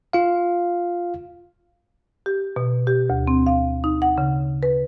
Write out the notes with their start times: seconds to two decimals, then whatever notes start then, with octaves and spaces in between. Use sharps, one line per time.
0.13 F4 F5
2.26 G4
2.56 B2
2.87 G4
3.10 D2
3.27 C4
3.47 F5
3.84 D#4
4.02 F#5
4.18 C#3
4.63 B4